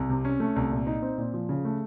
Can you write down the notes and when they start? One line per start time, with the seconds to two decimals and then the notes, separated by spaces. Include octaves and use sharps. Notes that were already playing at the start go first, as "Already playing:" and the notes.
Already playing: C2
0.09 C3
0.25 C#4
0.40 A3
0.56 C2
0.71 A#2
0.87 D#4
1.02 C4
1.18 A#2
1.34 F3
1.49 C#3
1.65 A3